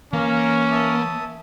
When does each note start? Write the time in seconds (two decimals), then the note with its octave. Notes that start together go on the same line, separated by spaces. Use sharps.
0.13 E3 A#3 C#4 F5 A#5
0.72 E5 A5 D#6